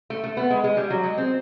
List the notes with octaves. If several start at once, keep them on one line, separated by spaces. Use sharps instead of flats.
A3
A3
B3
G#3
G#3
G3
F#3
G#3
C4